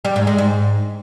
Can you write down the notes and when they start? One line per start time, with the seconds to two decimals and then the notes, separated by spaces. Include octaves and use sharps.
0.05 G3
0.16 G#2
0.27 G#3
0.38 G#2